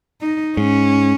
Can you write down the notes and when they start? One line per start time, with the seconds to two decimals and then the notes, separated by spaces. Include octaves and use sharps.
0.21 D#4
0.57 G#2 C#4